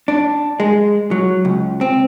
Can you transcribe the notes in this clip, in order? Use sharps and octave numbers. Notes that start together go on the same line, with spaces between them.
D4
G#3
F#3
C#2
C4